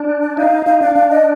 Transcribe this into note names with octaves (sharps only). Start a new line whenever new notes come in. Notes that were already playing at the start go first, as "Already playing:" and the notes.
Already playing: D4
D5
D#4 F5
D#4 F5
D4 F5
D4 F5
D#5